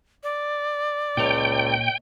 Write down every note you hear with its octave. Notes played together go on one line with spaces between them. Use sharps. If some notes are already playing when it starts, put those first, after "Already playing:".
D5
C#2 A#2 C#5 D#5 G5